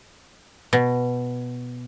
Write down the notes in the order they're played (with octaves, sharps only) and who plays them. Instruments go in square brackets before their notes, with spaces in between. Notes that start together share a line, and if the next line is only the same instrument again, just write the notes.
[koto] B2